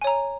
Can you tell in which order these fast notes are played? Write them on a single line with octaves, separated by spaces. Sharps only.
G#5 C#5 A#5